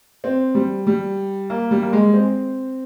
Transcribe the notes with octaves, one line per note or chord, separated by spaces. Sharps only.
C4
G3
G3
A#3
G3
A#3
G#3
C4